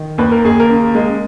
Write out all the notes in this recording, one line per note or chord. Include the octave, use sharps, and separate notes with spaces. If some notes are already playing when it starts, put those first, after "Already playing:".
Already playing: D#3
D#2 B4
A#4
D#2 G#4
A#4
C#3
G#3